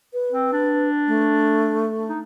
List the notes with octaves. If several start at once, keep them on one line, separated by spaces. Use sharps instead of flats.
B4
C4
D4
A3
D#4